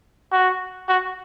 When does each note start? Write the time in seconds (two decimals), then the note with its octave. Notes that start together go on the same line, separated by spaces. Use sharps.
0.32 F#4
0.89 F#4